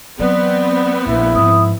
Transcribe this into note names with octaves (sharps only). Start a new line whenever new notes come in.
E3 F#3 B3 C4 D5
A#1 E4
G#2 F3 D#6